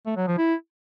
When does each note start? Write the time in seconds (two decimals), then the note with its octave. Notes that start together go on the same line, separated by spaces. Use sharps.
0.06 A3
0.17 F#3
0.27 F3
0.38 E4